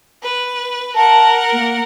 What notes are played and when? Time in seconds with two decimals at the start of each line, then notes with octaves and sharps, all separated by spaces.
0.22 B4
0.95 A#4 F#5 A5
1.53 A#3